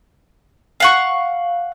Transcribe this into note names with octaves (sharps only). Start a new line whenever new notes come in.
F5 F#5 C#6